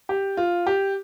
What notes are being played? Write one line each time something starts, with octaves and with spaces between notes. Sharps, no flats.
G4
F4
G4